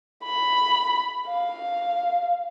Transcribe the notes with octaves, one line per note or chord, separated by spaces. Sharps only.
B5
F5